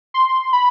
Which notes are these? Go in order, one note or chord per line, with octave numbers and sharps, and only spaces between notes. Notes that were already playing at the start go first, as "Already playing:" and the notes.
C6
B5